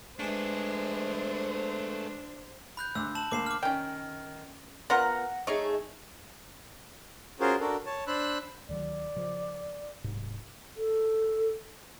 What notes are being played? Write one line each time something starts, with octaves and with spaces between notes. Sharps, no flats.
G#3 A3 D4 G#4 B4 C5 E5
B5 F#6 G6
D2 D6 E6 F#6
A5 E7 F#7
D2 A#3 D6 C7 E7
D6 F6
D#3 C#4 G5
B3 F4 A#4 F#5 A#5
A3 D#4 G#4 C#5 D#5
C#4 F4 F#4 G#4 A#4 C5
D4 F#4 A4 A#4
C#5 A5
D4 C5 B5 E6 F#6
D2 D#3 F#3 D5
C#3 F3
D1 G#2 C3
A4